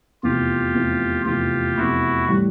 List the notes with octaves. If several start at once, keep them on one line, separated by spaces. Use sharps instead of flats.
F1 E2 C3 F4 G4
F1 E2 C3
F1 E2 C3 F4 G4
F1 E2 C3 E4 F#4
A2 E3 G3